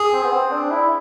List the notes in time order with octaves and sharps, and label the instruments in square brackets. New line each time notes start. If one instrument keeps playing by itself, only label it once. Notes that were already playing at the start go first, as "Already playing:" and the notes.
Already playing: [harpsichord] G#4
[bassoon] C4
B3
C4
D4
E4